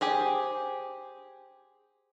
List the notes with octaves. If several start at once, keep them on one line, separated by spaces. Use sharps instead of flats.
G4 G#4 C5